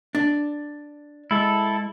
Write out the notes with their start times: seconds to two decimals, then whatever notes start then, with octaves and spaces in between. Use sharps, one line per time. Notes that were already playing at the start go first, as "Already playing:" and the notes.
0.15 D4
1.31 G#3 E4 A4